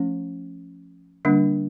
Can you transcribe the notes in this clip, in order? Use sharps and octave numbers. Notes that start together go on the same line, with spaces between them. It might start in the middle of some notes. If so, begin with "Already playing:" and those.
Already playing: F3 A3 C#4
D3 G3 A#3 D4